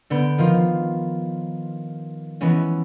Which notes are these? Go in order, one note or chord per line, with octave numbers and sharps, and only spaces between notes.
D3 B3 G6 D7
D#3 F3 F4
E3 G#3 B3 C#4